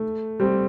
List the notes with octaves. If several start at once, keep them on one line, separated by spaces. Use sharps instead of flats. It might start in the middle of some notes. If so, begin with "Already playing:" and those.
Already playing: A3
G3 C4